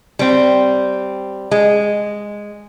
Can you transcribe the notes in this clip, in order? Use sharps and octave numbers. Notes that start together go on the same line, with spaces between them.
G3 C4
G#3